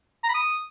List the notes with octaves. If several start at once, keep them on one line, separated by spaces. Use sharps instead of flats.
A#5
B5
D#6